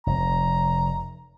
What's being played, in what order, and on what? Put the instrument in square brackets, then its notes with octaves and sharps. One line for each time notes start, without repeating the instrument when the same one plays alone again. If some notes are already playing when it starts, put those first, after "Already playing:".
[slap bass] F1 [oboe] A#5